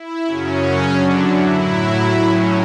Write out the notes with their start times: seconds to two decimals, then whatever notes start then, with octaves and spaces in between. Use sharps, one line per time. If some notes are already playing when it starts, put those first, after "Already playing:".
Already playing: E4
0.25 F#2 C#3 F#3 C#4
0.91 F#2 D3 F#3 D4
1.23 E4
1.55 A2 F#3
2.20 A2 F#3 C#4